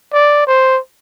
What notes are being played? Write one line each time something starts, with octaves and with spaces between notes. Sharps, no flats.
D5
C5